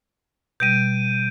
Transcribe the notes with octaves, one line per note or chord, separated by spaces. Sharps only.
B2 G3 G6 D7 D#7